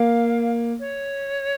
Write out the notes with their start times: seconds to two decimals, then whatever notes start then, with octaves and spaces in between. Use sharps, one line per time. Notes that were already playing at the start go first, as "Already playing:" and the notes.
Already playing: A#3 F5
0.79 C#5